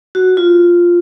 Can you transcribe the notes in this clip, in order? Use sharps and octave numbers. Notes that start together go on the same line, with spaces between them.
F#4
F4